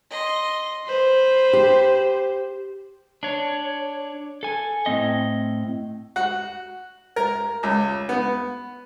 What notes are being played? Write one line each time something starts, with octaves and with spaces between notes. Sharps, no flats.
D#5 C6
B4 C5
G4
D4 C#5
A4 G#5
A2 C4 D#5
F#4
A#4
C#2
B3